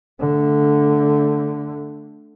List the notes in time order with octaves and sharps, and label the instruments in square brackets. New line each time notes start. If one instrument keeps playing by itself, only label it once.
[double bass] D3 A3